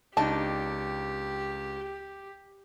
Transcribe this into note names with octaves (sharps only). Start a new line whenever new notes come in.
C#2 D4 D#4 G4 A5